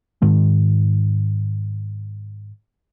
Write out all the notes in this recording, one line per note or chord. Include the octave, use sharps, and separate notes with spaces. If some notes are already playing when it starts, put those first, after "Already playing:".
G#2 D#3 G#3